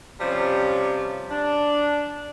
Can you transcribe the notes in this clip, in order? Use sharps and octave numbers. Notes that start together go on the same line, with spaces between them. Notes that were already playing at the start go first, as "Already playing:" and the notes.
C3 F3 G3 C#4
D4